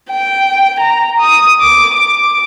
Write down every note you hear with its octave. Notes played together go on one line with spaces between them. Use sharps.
G5
A#5
D#6
D6
D6